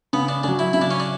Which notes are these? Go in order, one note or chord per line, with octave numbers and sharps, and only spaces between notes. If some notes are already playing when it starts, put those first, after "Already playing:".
C#3 B3
D4
F#3 C#4 D4
E4
C#3 E4
D4
C#4
D4